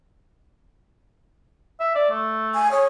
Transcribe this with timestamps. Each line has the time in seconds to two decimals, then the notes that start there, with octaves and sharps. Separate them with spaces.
1.80 E5
1.95 D5
2.10 A3
2.55 G#5
2.72 G#4 C#5